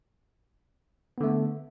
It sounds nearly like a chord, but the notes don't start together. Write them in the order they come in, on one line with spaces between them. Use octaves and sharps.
B3 D3 A3